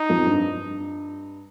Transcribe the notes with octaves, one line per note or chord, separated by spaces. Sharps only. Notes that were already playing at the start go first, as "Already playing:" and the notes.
Already playing: D#4
F2
G2